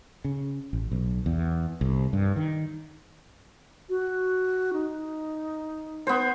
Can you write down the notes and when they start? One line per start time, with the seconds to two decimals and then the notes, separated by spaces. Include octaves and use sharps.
0.24 C#3
0.73 A1
0.92 B1
1.26 E2
1.81 C2
2.13 G2
2.36 D#3
3.89 F#4
4.73 D#4
6.07 B3 C5